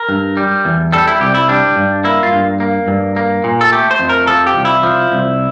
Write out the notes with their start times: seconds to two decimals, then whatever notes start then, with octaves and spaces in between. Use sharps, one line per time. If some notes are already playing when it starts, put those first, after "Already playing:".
Already playing: A#4
0.09 G2
0.37 G3
0.65 E2
0.92 G3 A4
1.07 E4
1.21 C2 G4
1.34 E4
1.48 G3 D4
1.76 G2
2.04 A#3 E4
2.23 F4
2.33 G2
2.60 A#3
2.88 G2
3.16 A#3
3.44 A#2
3.61 A4
3.71 A3 G4
3.91 C5
3.99 F2
4.09 A#4
4.27 F3 A4
4.47 G4
4.56 C2
4.65 E4
4.83 F3
5.12 C2